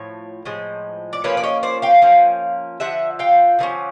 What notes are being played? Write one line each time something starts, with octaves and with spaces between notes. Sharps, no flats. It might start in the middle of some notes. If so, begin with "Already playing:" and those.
Already playing: A2 F3 C#5
A2 F3 G#3
D5
F3 A#3 C#4 B4 C#5
D5
C#5 D#5
C5 D5
F5 G5
F3 A#3 C#4
D3 F3 E5 F#5
F5 G5
D3 F3 A#3 C#4